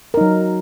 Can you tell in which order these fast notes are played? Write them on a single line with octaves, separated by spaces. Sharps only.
A#4 D#4 F#3